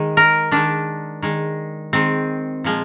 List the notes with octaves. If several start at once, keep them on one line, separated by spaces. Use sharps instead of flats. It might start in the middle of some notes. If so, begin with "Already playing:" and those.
Already playing: D#3 G#3
A#4
D#3 G#3 D4
D#3 G#3
D#3 G#3 C4
A#2 F3 G#3